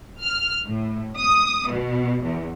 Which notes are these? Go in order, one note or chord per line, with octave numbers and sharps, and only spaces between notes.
F6
A2
D#6
B2
E2